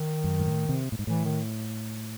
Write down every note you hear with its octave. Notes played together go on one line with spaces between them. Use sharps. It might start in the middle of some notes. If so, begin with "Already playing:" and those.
Already playing: D#3
F#2
G#2
A2
C3
A2
G#2
A2 E3
D#3